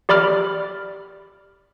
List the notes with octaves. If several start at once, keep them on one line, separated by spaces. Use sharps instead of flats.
G4 D5 B5 D6 F6